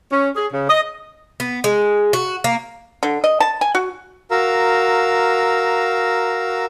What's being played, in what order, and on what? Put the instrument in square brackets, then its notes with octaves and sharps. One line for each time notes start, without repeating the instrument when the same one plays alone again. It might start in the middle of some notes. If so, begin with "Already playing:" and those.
[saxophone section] C#4
G#4
C#3
D#5
[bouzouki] B3
G#3
F#4
A#3
[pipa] D3
D#5
A5
G#5
F#4
[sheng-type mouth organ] F#4 A#4 F5 A#5 E6